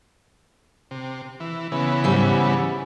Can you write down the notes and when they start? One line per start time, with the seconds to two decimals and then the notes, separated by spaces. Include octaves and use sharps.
0.91 C3
1.40 E3
1.72 C#3 E3 B3
2.04 G#2 G3